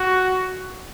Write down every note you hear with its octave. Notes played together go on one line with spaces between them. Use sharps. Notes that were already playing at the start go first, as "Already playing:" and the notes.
Already playing: F#4